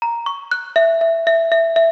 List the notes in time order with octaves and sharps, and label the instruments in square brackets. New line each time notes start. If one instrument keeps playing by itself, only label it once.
[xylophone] A#5
C#6
F#6
E5
E5
E5
E5
E5